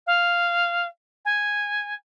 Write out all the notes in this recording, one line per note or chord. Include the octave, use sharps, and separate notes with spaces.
F5
G#5